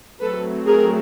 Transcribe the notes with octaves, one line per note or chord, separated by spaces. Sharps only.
F#3 A3 C4 A4 B4
G#4 A#4